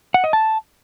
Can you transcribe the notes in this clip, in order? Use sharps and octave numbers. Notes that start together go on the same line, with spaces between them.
F#5
D#5
A5